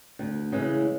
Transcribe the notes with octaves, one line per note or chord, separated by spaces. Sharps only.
D2
C#3 E3 G#3